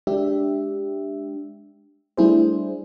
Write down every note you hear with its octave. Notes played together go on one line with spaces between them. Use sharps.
G#3 D4 G4 E5
G3 A3 D4 E4 G#4 C5